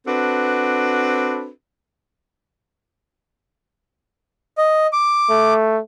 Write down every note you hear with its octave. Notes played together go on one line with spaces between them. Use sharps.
C4 D4 F#4 A4 B4
D#5
D6
A3